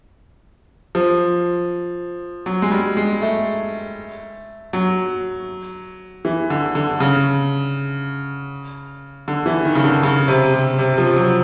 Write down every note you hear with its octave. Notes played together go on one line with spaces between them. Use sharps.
F3
F#3
G#3
G3
G#3
A3
F#3
E3
D3
D3
C#3
D3
E3
D#3
C#3
D3
C#3
C3
C3
C3
F3
F#3